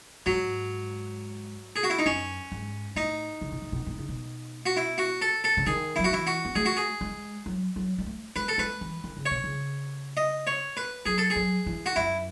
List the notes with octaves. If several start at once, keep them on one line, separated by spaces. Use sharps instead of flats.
G#2 F#3
G#4
F#4
E4
D#4
F#2 C#4
G#2
A2 D#4
C#3
B2
A2
B2
B2
C#3
B2
F#4
E4
F#4
A4
A4
C#3
D#3 G#4
F#3 E4
F#4
E3 E4
F#4
B3
A3 G#4
F#4
G#4
G#3
F#3
F#3
G#3
A3
G#3 B4
A4
G#3 B4
E3
D#3
C#3
C#5
B2
C#3
D#5
C#5
B4
F#3 G#4
A4
G#4
F#3
E3
F#4
F#2 E4